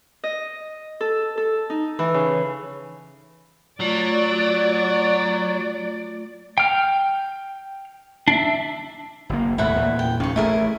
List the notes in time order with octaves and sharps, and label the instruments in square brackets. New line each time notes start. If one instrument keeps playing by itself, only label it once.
[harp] D#5
A4
A4
D#4
E3
C#3
[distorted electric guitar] F#3 [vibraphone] A3 F4 [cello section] D5
[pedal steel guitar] G5 F6
D4 E5
[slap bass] F#1 A#3
[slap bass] D#2 A2 A3 [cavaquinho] E4 F#5 B5
[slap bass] E2 A#2
[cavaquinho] G5
[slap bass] F1 D#3 C#4 [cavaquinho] F5 C#6
[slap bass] A1 A3 [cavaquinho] E4 G#4 A#4